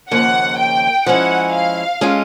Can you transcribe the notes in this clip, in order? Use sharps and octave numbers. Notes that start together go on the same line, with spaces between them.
D#2 C#3 F3 A#3 F#5
G5
F3 G#3 C#4 E4 F#5
F5
G#3 C#4 F4 A4